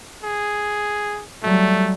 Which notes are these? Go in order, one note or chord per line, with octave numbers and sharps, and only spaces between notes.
G#4
F#3 G3 A3